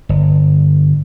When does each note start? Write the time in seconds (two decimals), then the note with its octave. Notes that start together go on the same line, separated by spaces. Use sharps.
0.09 G1